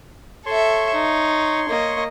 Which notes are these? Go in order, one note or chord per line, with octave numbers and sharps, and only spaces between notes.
A4 C#5 E5 C6 C#6
D#4
A#3 D#5